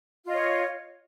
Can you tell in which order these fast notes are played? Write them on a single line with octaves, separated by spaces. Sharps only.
F4 D#5 C#5